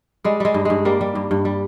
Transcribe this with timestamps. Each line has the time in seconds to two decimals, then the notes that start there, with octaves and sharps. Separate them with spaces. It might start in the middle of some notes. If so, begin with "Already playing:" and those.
0.24 G3 G#3
0.40 G3 G#3
0.54 G2
0.65 G2 G#3
0.85 G3 A#3
1.01 G3
1.15 G2
1.31 G2
1.45 G3